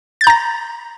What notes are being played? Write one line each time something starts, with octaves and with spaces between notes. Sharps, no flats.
A#5 G6 A6 A#6